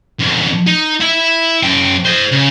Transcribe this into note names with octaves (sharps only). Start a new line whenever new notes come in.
F2 G#2
D#4
E4 E5
F#2 G5
C5 D#5
C#3 G#4